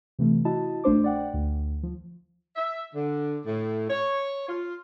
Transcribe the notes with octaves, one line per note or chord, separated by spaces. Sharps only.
C3 E3 A3
E4 F#4 D#5 A5
A#1 A3 D4 C5 D6
D5 F#5 G5
D2
F3
E5
D3
A2
C#5
F4